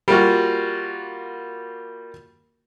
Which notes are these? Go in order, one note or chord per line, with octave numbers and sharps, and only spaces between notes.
G3 A#3 F4 F#4